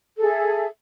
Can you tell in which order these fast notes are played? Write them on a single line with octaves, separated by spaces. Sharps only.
A4 G#4 E5